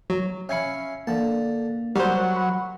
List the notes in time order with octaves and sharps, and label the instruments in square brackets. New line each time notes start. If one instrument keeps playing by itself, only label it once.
[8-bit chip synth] F#3
[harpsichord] C#4 F5 B5 [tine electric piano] E5 G#6 C#7
[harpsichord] D3 A5 [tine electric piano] A#3
[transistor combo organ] F#3 [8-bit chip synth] G3 C5 [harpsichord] A#4
[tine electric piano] B5